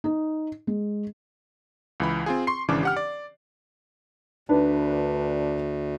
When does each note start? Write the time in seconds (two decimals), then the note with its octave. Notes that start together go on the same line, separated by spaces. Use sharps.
0.04 D#4
0.67 G#3
2.00 C#2 E3 B5
2.26 C4 F4 G#4
2.47 C6 C#6 C7
2.68 G#1 C#3 E3 C#4 D4 D6
2.83 G4 F#5 F6
2.97 D5
4.49 D2 D4 B4